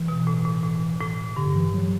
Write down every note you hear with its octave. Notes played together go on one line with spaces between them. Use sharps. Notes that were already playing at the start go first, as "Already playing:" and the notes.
Already playing: E3
B2
A2
A2
A2
A2
G2 D3
E3
F#3